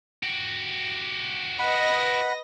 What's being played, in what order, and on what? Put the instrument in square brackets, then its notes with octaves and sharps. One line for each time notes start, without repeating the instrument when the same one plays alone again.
[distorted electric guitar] F#4 G4
[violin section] B4 D#5 A#6 [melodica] F#5 B5